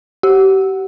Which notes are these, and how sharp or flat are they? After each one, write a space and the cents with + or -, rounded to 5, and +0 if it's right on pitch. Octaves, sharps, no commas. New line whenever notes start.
G4 -30 F#5 +0